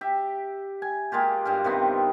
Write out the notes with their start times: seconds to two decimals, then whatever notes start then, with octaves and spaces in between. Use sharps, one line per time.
0.01 G4 E5
0.82 G#5
1.12 G#3 A#3 F4 G4
1.45 G2 G4 F5
1.64 C3 D#3 B3 C4